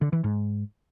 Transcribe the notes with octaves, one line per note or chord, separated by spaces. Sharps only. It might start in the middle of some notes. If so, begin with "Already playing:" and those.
D3
E3
G#2